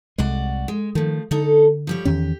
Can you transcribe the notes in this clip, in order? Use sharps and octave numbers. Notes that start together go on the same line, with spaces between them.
C2 G#3 F#4 D5 F#5
G#3
D#3 F3 A3
D3 D#4 A4
F3 G3 C#5
E2 D#3 C#4 G4